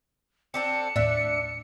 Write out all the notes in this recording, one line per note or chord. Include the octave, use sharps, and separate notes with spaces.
C4 D4 A4 C#7
D#2 A2 D4 D5 E5